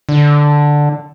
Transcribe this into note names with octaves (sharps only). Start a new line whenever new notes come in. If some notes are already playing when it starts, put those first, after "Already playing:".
D3